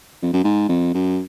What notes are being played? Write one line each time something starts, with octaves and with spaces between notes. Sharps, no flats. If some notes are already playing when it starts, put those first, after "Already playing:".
F2
F#2
G#2
F2
F#2